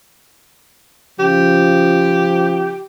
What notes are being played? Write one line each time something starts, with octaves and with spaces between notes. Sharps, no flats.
C#3 F3 G4